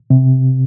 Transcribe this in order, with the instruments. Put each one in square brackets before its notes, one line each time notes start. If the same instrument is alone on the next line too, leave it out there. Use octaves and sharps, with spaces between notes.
[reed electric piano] C3